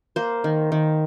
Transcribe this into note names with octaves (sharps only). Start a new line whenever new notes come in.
A#3 C5
D#3
D#3